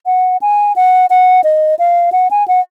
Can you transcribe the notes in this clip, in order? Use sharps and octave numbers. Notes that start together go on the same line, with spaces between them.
F#5
G#5
F#5
F#5
D#5
F5
F#5
G#5
F#5